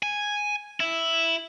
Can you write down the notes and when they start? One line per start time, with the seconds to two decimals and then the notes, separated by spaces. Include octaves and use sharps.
0.03 G#5
0.80 E4